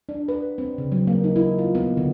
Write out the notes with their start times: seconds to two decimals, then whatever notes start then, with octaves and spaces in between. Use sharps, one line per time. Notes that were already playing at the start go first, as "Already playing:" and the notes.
0.09 D4
0.28 B4
0.58 C4
0.78 C#3
0.92 F#3
1.07 A#3
1.24 D#4
1.36 E4
1.58 F4
1.75 B3
1.97 D3